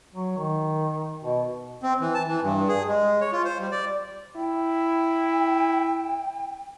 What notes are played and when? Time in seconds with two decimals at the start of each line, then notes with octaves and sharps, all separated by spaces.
0.14 F#3
0.38 D#3
1.24 B2
1.83 C4
2.01 E3
2.14 A5
2.28 E3
2.43 G2
2.69 G#4
2.88 G#3
3.21 C#5
3.33 F4
3.45 C5
3.59 G3
3.72 D5
4.36 E4 G5